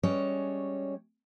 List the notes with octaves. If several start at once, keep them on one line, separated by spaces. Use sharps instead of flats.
G3 G#3 C#4 C#5